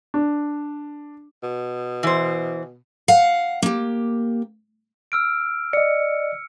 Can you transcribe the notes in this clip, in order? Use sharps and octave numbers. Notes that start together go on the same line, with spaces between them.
D4
B2
E3 C5
F5 F#5
A#3 G4
E6 F6 D7
D5 D#5 C#7